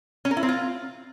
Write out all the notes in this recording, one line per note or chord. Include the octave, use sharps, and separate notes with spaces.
C#4
A#4
E4
C4
F4